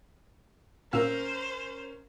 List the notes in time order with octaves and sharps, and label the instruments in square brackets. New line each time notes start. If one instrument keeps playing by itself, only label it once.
[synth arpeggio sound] A#2 F5 E6 [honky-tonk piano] C#4 A#4 [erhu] C5